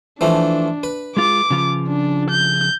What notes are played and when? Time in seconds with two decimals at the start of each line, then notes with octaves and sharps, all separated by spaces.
0.21 E3 F3 A3 D4
0.83 B4
1.17 G#3 F4 D6
1.50 C#3 F3 F4
1.89 D4
2.31 G6